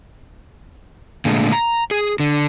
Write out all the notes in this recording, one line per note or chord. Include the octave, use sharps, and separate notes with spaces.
A#2 D3 G#3 A3
A#5
G#4
D3